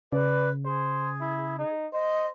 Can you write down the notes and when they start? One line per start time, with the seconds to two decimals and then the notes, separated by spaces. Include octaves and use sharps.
0.13 C#3 B4 D5
0.65 G#4 C5
1.21 E4
1.59 D#4
1.93 C5 D#5